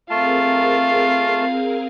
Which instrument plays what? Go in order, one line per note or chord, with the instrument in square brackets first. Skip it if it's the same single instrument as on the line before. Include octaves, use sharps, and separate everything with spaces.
[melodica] A3 A5 [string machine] C4 G#4 A#4 [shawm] F4 [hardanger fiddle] F5